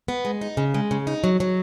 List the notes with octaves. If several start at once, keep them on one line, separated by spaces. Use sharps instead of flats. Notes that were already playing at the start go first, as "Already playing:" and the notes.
B3
G#3
D#4
C#3
G#3
C#3
D#4
F#3
F#3